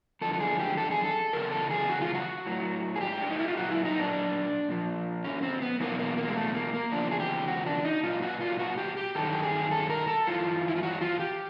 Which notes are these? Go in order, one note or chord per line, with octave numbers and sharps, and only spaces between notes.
F#2 D3 F3 A4
A4
G#4
G4
A4
G#4
A4
E2 C#3 F#3 A#4
A4
G#4
F#4
F4
F#4
A2 F#3
G#4
G4
D4
D#4
E4
F4
A#2 F#3 F#4
E4
D#4
D4
A#2 F3
C#4
C4
B3
E2 B2 F#3 A#3
A#3
A#3
G#3
A3
A#3
A#3
E2 C#3 F3 D4
G#4
G4
F#4
D4
D#4
A#2 F#3 F4
F#4
F4
F#4
G4
G4
G2 D#3 F#3 A4
G4
G#4
A4
A#4
A4
G2 E3 F4
E4
F4
F#4
F4
G4